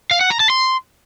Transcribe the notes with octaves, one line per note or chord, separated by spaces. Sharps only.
F5
F#5
A#5
A5
C6